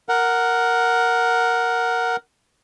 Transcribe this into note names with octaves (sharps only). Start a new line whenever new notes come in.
A#4 F#5